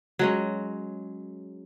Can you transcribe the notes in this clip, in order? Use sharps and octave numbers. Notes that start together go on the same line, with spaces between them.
F#3 G#3 C#4